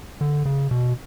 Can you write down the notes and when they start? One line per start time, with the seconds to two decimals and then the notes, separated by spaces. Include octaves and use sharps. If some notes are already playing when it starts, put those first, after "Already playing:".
0.21 D3
0.45 C#3
0.71 B2